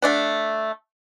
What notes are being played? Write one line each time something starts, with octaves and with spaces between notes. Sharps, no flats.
A3 D4 F#5